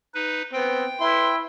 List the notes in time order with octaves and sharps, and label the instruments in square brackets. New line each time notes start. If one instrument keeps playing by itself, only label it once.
[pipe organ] D#4 B4
[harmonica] B3 C4 [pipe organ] G5
[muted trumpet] E4 [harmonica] B4 C6